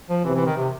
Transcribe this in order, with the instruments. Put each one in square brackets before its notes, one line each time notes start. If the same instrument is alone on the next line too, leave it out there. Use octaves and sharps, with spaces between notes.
[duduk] F3
[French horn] C3 [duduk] E3
[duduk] E3
D#3
C3